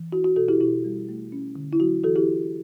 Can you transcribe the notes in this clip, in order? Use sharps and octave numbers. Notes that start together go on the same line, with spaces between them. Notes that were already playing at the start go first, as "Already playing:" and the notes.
Already playing: E3
E4 F#4
F#4
B2 F#4 A4
E4 G4
B2 E4 G4
G3
A3
C#4
D3
E4
F#3 F#4
E3 F#4 A4
E4 G4